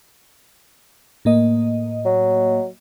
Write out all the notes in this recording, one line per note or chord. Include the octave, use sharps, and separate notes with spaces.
A2 A#3 D#5
F#3